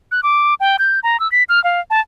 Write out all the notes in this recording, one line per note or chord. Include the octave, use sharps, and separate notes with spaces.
F#6
D6
G5
G6
A#5
E6
B6
F6
F5
A5